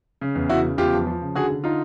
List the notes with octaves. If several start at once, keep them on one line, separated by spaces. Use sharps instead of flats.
C#3
E2
C#3 E4 F#4
C#3
E2 F4 G4
F3
F3
C#3
D3 F#4 G#4
D3
D3 D#4 F4